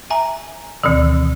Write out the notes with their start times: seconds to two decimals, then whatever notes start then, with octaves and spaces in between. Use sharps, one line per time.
0.10 E5 G#5 A#5
0.83 D2 B2 D#3 E3